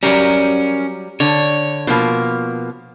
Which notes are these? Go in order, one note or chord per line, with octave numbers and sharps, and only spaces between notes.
F#3 G3 C#4 A#4
D3 C#5
B2 F3 A#3